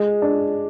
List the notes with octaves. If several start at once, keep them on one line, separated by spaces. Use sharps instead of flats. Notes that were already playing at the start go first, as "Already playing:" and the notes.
Already playing: G#3
D4